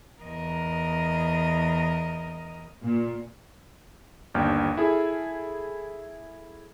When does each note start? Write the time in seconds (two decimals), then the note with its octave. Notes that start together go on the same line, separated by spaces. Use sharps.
0.24 E2 A#4 D#5
2.83 A#2
4.34 G1 D#2 D4 G5 F6
4.77 E4 G#4 A4 E5